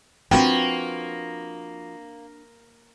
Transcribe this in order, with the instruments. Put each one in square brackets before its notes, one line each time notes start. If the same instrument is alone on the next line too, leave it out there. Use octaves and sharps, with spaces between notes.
[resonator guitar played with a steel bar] F3 F#4 B4 [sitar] A#3 [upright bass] C4 D4 [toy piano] G5